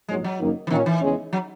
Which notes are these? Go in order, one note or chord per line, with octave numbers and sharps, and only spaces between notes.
A#1 G#2 F#3 G#3
F#3
F#1 F#2 D#3 A#3 D#4
E3
A#2 D#3 A#3 C#4
E3
E2 C#3 G#3 C#4
F#3